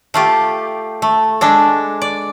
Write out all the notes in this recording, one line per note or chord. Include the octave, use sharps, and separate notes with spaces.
A3 F4 G4
A3
G#3 D4 A4
D5